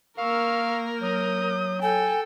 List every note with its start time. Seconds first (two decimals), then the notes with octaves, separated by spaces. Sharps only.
0.18 A#3 A#4 F5 C#6 E6
1.01 F#3 D#6 G6
1.82 A4 G5 G#5